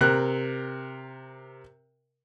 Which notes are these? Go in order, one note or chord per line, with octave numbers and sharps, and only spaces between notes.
C3 A#4 F#6